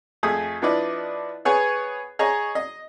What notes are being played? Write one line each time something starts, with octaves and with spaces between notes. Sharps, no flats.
F2 A3 G#4 D#6
F3 B3 D4 E4 D5 D#5
B3 G#4 C#5 G#5
G#4 C#5 D#5 A#5
D#5